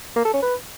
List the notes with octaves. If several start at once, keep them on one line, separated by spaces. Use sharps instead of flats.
A#3
A4
C#4
B4